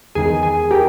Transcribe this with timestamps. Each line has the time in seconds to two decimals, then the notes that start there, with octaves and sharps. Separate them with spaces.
0.15 E2 D#3 G#3 G#4
0.43 G#4
0.71 G4 A#4